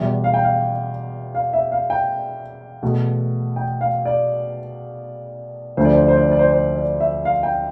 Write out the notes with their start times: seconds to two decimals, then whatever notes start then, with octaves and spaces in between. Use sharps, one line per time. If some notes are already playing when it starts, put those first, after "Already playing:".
Already playing: E2 B2 G3 E5
0.24 F5
0.34 G5
0.43 F5
1.35 F5
1.53 E5
1.72 F5
1.90 G5
2.83 E2 B2 A3
3.56 G5
3.81 F5
4.05 D5
5.77 D2 D3 F3 A3 C5
5.85 D5
5.93 C5
6.01 D5
6.08 C5
6.16 D5
6.24 C5
6.31 D5
6.39 C5
6.51 C5
6.76 D5
7.00 E5
7.25 F5
7.43 G5